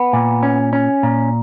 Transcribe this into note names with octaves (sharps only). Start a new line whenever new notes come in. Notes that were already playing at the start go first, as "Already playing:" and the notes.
Already playing: B3
A#2
C#4
C#4
A#2